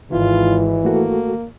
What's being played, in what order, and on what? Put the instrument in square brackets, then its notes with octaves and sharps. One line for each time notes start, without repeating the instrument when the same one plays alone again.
[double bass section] G#1 [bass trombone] E3 [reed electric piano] E4 [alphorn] F4
[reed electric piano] A3 F#4 A4 [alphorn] A#3